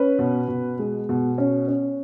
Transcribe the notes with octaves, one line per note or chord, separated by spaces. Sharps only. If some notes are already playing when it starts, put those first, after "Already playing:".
Already playing: C#4 B4
B2
B2
G#3
B2
C#4
C#4